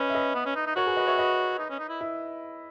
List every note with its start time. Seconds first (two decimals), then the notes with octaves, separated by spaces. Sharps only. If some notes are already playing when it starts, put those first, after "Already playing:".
Already playing: C#4 B4 D#5
0.09 E5
0.15 B4 D#5
0.35 B3
0.46 C#4
0.55 D#4
0.66 D#4
0.76 F#4 A#4 C#5
0.86 G#4 B4
0.97 B4 D#5
1.07 C#5 E5
1.18 B4 D#5
1.59 D#4
1.70 C#4
1.79 D#4
1.89 E4
2.01 E4